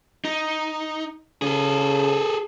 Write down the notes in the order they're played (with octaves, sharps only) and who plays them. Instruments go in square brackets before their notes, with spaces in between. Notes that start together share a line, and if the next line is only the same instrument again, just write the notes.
[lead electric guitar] D#4
[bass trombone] C#3 [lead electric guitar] G#4 A4